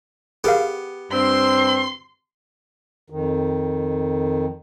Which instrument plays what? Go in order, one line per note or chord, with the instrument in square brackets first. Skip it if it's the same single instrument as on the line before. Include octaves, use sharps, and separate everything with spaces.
[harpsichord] B3 G4 [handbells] G#4 A#4 F5
[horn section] G2 C4 [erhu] C6
[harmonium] F2 D#3